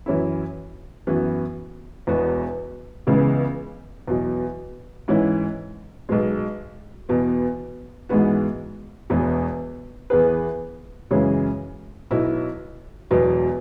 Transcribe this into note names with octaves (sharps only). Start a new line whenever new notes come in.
F#2 E3 C#4 E4
F#2 E3 B3 F#4
E1 E2 B2 B3 F#4
C#2 C#3 E3 B3
E2 B2 F#3
G#2 E3 C#4 E4
B1 B2 G#3
E2 B2 B3
G#2 E3 G#3 B3 F#4
E1 E2 E3 B3
E2 E3 B3 G#4 B4
F#2 C#3 E3 G#3 C#4
B1 B2 F#3 E4
E1 E2 B2 F#3